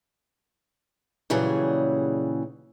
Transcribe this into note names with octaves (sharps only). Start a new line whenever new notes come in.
A#2 C#3 E3 F#3 G3 G#4